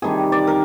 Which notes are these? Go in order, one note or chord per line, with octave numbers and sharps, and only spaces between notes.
C3 D#3 G3 D4 G#4
D5
A#4